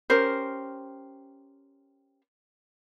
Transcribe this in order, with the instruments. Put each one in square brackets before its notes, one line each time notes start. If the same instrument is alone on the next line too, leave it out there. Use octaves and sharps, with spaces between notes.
[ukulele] C#4 G4 A#4 C5